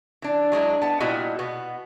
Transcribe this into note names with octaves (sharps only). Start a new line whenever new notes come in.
E3 D4
F#3 G#3 D4 E4
B3 A5
A#2 G3 B3 E4 F#4 D#5
B2 B3